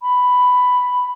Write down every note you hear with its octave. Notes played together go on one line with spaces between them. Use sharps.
B5